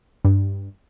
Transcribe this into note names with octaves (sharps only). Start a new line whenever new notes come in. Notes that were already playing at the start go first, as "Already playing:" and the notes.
G2